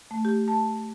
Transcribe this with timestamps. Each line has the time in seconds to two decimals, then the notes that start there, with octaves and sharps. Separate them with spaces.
0.11 A3
0.25 G4
0.48 A5